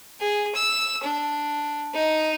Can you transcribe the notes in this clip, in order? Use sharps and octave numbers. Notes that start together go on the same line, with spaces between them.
G#4
E6
D4
D#4